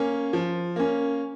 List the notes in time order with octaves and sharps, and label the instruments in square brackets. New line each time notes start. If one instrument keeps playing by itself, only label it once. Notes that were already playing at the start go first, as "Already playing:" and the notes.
Already playing: [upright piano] A#3 C#4
F3
A#3 C#4